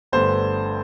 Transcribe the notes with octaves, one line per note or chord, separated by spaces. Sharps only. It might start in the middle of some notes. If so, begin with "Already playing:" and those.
G1 G2 D3 A3 C5